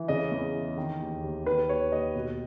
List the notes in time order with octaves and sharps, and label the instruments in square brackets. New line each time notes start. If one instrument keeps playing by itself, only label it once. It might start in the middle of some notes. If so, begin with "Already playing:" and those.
Already playing: [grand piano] E3
C#3 D#5
E2
E3
D#3
D#2
D#2
D#3 B4
D#2 C#5
D#2 D#5
B2